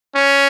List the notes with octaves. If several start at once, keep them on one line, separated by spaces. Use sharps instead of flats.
C#4